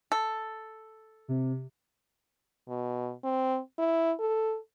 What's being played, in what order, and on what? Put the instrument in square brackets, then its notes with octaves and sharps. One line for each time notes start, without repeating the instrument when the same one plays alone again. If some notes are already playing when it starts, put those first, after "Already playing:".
[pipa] A4
[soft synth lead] C3
[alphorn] B2
C4
E4
A4